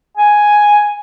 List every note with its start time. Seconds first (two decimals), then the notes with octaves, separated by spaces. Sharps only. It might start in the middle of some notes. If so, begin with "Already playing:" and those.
0.18 G#5